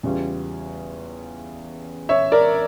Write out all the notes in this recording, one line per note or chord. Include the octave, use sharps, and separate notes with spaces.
E2 C#3 G3 C#4 F4
C#5 E5
A#4 D5